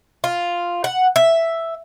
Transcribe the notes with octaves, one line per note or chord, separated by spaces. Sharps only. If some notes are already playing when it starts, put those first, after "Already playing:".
F4
F#5
E5